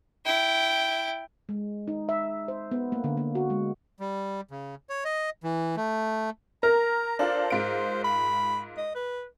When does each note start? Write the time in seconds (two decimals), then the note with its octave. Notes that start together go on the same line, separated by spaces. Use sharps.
0.25 E4 G5
1.49 G#3
1.88 D#4
2.09 E5
2.48 C5
2.71 B3
2.92 A#3
3.04 D3
3.17 A#3
3.35 F#4
3.50 G#3
4.00 G3
4.51 C#3
4.89 C#5
5.05 D#5
5.44 E3
5.77 A3
6.63 A#4 A#5
7.19 D4 F4 A4 C5
7.50 G#2 F4 D7
8.04 B5
8.78 D#5
8.95 B4